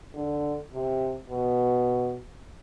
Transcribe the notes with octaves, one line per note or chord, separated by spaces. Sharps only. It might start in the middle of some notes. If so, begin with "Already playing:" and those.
D3
C3
B2